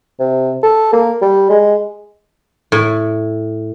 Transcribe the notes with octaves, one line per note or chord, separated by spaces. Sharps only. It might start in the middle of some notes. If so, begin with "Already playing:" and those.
C3
A4
A#3
G3
G#3
A2